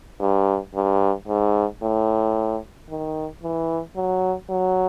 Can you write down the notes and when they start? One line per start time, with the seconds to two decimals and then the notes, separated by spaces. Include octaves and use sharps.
0.20 G2
0.74 G2
1.27 G#2
1.82 A2
2.89 D#3
3.43 E3
3.96 F#3
4.50 F#3